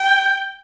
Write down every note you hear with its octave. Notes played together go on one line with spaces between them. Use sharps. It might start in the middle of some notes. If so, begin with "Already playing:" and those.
Already playing: G5